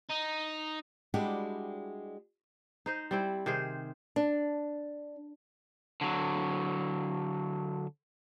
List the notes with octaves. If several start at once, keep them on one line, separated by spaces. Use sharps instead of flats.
D#4
G3 G#3 D4 E4 F#4 G4
D#4 C5 D#5
G3 C4 E4
C3 D#3 G#4 C5
D4
D3 F#3